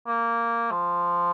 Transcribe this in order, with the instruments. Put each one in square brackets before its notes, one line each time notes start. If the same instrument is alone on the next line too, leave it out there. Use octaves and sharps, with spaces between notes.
[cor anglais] A#3
F3